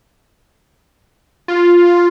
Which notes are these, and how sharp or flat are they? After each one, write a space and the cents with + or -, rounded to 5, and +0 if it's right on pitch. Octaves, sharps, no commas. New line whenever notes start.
F4 +0